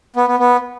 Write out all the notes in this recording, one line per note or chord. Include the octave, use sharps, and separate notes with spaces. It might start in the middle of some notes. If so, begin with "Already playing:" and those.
B3
B3
B3